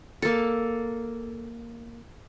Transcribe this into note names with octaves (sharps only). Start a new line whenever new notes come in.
A#3 A4